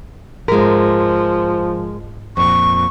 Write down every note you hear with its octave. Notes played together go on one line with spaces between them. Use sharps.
G#2 F3 G#3 A#4
F2 A#2 C#6